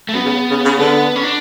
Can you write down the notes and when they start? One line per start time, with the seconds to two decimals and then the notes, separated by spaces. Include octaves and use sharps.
0.09 A3
0.14 F#2 B3
0.25 C#3
0.51 C#3
0.65 C#3
0.79 D3 B3
1.16 C#4
1.23 D4